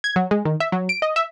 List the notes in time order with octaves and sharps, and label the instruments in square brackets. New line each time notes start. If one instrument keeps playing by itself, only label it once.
[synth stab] G#6
F#3
G#3
D#3
E5
F#3
D7
D#5
E5